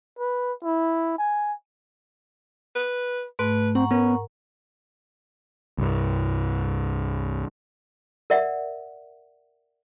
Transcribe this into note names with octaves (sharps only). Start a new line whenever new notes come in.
B4
E4
G#5
B4
G#2 A3 B4
C4 F#5 A#5 C#6
B3 C#4 A#4
C2 G2
A#4 D5 E5 F#5